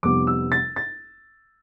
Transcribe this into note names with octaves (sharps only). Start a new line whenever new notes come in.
F1 F2 C3 G3 B3 D6
E6
A6
A6